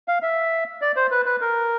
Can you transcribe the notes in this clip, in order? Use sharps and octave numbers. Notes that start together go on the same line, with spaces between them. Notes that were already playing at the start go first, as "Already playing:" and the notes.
F5
E5
D5
C5
B4
B4
A#4